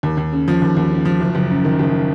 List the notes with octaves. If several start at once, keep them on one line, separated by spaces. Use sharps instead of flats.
D#2
D#2
C#3
F3
D#2
D#2
C#3
F3
F#1
F#1
F#2
D#3
F#1